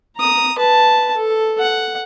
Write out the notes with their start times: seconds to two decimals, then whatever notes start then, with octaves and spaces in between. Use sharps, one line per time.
0.17 A#5 D#6
0.58 B4 A5
1.17 A4
1.60 F#5